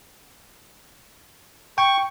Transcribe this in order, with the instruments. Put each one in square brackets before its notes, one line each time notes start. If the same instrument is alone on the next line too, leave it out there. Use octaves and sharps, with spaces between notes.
[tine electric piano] G5 [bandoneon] C#6